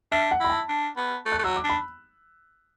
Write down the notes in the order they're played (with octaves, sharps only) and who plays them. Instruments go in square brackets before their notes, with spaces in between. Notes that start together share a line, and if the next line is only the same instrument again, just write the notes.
[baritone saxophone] D4 [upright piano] E5
[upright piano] F#5
[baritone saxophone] E4 [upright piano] B5
[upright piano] A5
[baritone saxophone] D4
B3
A3
[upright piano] F#6
[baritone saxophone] A3
[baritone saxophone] F#3 [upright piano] E6
[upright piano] D6
[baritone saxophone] D4
[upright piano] B5